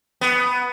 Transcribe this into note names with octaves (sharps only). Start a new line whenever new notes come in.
B3